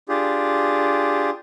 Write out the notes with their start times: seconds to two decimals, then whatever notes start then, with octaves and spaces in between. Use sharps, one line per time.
0.09 D4 F4 G4 G#4